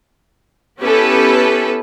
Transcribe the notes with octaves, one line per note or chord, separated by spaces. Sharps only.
B3 C#4 E4 G4 A4 B4